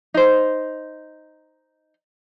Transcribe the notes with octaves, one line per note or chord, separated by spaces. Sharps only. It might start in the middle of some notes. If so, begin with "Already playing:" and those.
D#4 C5